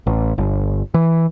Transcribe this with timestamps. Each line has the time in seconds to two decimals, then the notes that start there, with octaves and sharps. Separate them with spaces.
0.07 A1
0.38 G1
0.94 E3